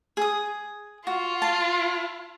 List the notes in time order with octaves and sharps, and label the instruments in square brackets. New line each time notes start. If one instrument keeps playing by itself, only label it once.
[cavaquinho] G#4 D#6
[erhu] F4 [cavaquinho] F#4
[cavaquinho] A5